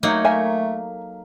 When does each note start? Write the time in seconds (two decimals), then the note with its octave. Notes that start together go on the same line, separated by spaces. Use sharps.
0.03 F#3 A3 A#3 D#4 G6 G#6 C#7
0.24 A4 A#4 E5 F5 G#5